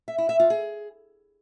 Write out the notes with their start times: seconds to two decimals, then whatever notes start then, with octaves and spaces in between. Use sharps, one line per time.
0.08 E5
0.18 E4
0.29 E5
0.40 F4
0.50 G#4